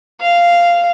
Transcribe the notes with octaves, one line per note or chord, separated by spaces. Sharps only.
F5